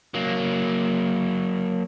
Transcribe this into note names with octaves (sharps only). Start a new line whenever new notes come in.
F#3 A#3